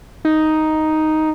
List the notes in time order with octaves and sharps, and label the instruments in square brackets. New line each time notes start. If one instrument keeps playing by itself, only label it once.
[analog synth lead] D#4